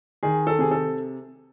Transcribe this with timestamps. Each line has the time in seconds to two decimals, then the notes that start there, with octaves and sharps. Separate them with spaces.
0.23 D#3 G#4
0.47 A4
0.59 C3 G#4
0.71 A4